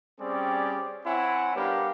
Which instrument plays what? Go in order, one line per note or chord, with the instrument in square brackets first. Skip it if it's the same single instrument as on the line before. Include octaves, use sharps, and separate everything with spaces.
[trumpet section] G3 C4 C#4 G4 G#4 D5
C4 E4 C#5 F#5 G#5
G3 B3 D4 G4 A#4 F5